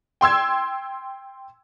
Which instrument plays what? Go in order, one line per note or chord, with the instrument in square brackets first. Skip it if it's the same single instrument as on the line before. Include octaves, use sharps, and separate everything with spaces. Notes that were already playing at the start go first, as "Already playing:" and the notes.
[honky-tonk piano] G5 C6 E6 G#6